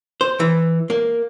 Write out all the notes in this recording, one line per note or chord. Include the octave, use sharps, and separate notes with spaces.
C5
E3
A#3